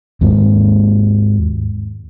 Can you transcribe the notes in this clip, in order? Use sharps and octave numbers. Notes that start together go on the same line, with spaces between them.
D#2 G#2 G#3